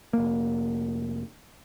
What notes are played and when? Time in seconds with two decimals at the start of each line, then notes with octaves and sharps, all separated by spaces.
0.13 F1 A#3